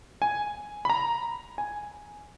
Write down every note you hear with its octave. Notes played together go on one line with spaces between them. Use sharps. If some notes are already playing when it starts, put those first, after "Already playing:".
G#5
B5
A#5
G#5